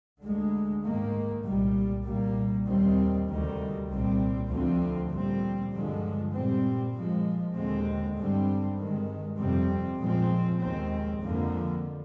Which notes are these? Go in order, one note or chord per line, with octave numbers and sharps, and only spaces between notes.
D2 D3 G#3
G#2 D#3 A#3
C2 A#2 G3
C2 A#2 G3 A#3
D#2 D#3 G3 C4
D2 C3 D#3 G3
C2 A#2 G3 C4
D2 D3 F3 C4
A#2 G3 C4
G2 D3 F3 G#3
A#2 G3 C4
A#2 F3 G#3
D#2 D3 G#3 C4
G2 D3 G3 C4
G2 D#3 G#3
F2 C3 G3 C4
A#2 F3 G#3 C4
D#2 D#3 G#3 C4
F2 D3 F3 A#3